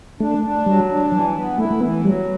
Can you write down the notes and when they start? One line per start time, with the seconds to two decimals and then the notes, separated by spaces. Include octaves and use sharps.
0.20 A3 D4
0.43 D4
0.66 F#3 G3
0.90 D4
1.12 E3 F#3
1.35 B3
1.58 A3 E4
1.71 A3
1.81 E3 B3
2.04 F#3 G3